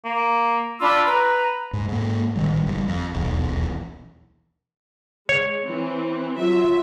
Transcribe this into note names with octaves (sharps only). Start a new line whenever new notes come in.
A#3
D4 F4 B5 E6
B4 A#5
G#2
G#2 A#3
A1 D#3 G3
F#1 G3
F2
D#1 B1 E2
G#3 C#5
E3 C4
F#3 F4 E5